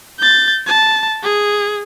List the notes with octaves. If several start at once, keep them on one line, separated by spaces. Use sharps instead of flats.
G6 A6
A5
G#4